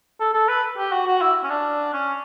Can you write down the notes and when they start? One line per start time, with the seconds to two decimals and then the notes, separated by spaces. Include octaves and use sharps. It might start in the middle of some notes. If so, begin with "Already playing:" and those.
0.20 A4
0.34 A4
0.49 B4
0.77 G4
0.92 F#4
1.07 F#4
1.21 E4
1.44 C#4
1.50 D4
1.94 C#4